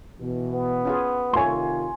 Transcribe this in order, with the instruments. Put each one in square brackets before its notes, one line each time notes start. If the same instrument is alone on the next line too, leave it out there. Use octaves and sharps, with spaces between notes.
[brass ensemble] B2 E3
[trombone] B3
[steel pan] C#4 F4 G#4
[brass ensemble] C3 D#3 F4 [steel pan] A3 C#5 [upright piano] G#5 C6